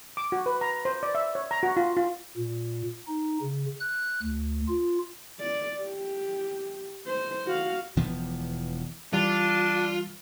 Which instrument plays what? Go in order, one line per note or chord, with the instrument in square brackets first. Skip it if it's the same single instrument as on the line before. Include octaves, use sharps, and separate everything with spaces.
[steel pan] D6
F#4
B4
A#5
C5
D5
E5
C#5
A#5
F#4
F4
F4
[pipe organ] A#2
D#4
C#3
F#6
D2
F4
[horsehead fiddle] D5
G4
C5
F#4 F5
[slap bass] E1 E3 F3 B3
[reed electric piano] E3 G3 [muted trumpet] D4 [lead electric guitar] F4